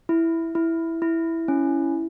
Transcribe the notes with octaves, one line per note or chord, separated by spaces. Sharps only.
E4
E4
E4
C#4